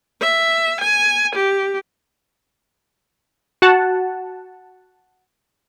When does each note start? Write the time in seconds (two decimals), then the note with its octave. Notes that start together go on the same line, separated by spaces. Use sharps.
0.21 E5
0.81 G#5
1.35 G4
3.62 F#4 F#5 A5